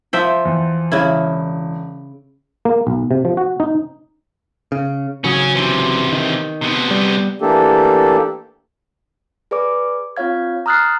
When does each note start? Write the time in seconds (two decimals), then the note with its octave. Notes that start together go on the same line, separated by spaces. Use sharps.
0.13 F3 E5 G5
0.45 E2
0.92 E1 C#3 E4
2.65 A#3
2.87 B1
3.11 C3
3.25 F3
3.37 F#4
3.60 D#4
4.72 C#3
5.24 G#1 C#3 F#3 C#4 G#4
5.54 C3 E3
6.13 D#3
6.61 C3 B3
6.91 G3
7.41 E3 A3 A#3 D4 G4 A4
9.51 G#4 B4 D5 D6
10.17 C4 F4 C#5 F5 G#6
10.66 A#5 D#6 F6 F#6 A6 C7